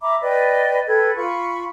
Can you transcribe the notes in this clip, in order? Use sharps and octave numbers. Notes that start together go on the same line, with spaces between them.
E5 A#5 B5 D6
B4 D5 D#5 G5
A4 B4 G5 G#6
F4 B5 C#6